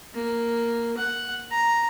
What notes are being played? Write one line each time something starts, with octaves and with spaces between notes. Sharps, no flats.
A#3
F#5
A#5